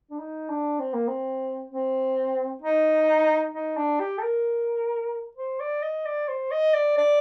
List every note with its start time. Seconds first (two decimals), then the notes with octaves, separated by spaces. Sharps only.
0.11 D4
0.19 D#4
0.49 D4
0.80 C4
0.94 A#3
1.08 C4
1.71 C4
2.62 D#4
3.54 D#4
3.77 D4
4.00 G4
4.18 A4
4.23 A#4
5.37 C5
5.60 D5
5.83 D#5
6.06 D5
6.29 C5
6.52 D#5
6.74 D5
6.97 D5